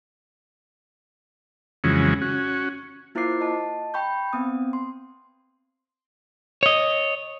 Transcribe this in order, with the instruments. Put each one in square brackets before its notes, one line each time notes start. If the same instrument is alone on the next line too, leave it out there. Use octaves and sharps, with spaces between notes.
[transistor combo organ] F2 C#3 E3 F#3 G#3 C#4
C#4 F#4
[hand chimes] A#3 E4 F4 C5 D6 C7
D#5 A5
G5 B5 C#6 G6
B3 C4 D#6
C6
[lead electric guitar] C#5 D#5